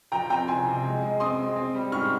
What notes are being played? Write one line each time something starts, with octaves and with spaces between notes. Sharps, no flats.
F3 G5 A#5
C4 G5 A#5
C2 G#5 C6
C3
G#3
G#3
C4 C6 D#6
G#3
C4
G3
G#2 C#6 F6